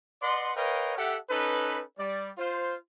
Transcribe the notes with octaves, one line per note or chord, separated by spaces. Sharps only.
B4 D5 D#5 F#5 C6
A#4 B4 C#5 D#5 F5 G5
G4 A4 E5 F#5
C#4 D#4 A4 B4
G3 D5
F4 C5